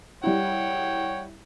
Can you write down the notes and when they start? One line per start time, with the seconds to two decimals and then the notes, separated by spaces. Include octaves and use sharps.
0.23 G3 E4 C#5 F#5 G5